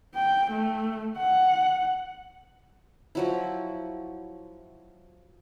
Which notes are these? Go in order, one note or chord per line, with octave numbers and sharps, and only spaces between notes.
G5
A3
F#5
F3 F#3 E4